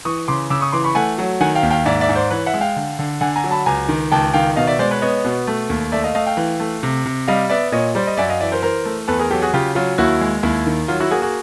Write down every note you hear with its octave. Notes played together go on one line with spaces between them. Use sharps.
E3 C#6 D#6
C#3 C6 D6
C#3 D6 E6
C#6 D#6
E3 C6 D6
B5 C#6
A3 F#5 G#5
F#3
D#3 F#5 G#5
F5 G5
D#2
F5 G5
G#2 D5 E5
D5 E5
G#2
C5 D5
E3 B4 C#5
E5 F#5
G#3
F5 G5
D3
D3
D3 F#5 G#5
G#5 A#5
F#3
A5 B5
C#2 G#5 A#5
D#3
C#2 G5 A5
D#3 F5 G5
B2 D#5 F5
D5 E5
G#3 C5 D5
B4 C#5
B3 C#5 D#5
B2
A3
D#2
A3 D5 E5
D#5 F5
A3 D#5 F5
F5 G5
E3
A3
C3
C3
G3 D#5 F5
B3 D5 E5
A#2 C#5 D#5
G3 C5 D5
D#5
F#2 D5 E5
D#5 F5
E3 D5 E5
A#4 C5
E3 A#4 C5
A3
E2 A4 B4
G#4 A#4
F#3 G4 A4
F#4 G#4
C#3 F4 G4
F#3 F4
D#2 E4 F#4
G#3
D#2 E4
D#3
F#3 F4
E4 F#4
A#3 F#4 G#4
F#4 G#4